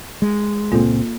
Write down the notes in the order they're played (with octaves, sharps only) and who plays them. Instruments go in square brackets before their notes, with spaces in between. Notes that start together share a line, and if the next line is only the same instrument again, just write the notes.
[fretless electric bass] G#3
[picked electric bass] C#2 A#2 C4 [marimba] A#3 F4 A4